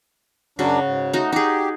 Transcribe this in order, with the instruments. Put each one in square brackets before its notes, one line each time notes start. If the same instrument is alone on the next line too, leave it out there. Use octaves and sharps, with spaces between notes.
[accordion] F#2 F#3 D4 [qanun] C#3 F#4
[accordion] G#2
[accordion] A3 [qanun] D#4 F#4
[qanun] D#4 G#4 [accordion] G4